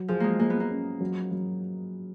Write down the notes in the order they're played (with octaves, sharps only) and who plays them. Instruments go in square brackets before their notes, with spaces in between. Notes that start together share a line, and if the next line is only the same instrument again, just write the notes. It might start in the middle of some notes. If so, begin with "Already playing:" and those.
Already playing: [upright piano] F#3
[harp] F3 [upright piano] G#4
[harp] G#3 A#3
[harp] A#3 [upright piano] G#4
[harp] B3
A#3
[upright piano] C#4
F#3
F#3